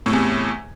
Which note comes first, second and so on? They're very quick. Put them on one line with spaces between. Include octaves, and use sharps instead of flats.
A2 C3 E2